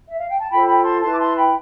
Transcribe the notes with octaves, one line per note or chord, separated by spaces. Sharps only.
E5
F5
G5
A5
F4 A4 C5 G5 B5
G5 B5
A5 C6
E4 B4 A5 C6
D6
A5 C6
G5 B5